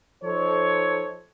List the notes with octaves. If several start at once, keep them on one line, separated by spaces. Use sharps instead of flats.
F3 D#4 A4 C5 C#5